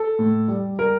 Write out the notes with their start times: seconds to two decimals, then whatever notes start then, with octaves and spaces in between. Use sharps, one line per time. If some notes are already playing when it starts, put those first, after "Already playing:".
Already playing: A4
0.19 A2
0.48 G3
0.79 G3 A#4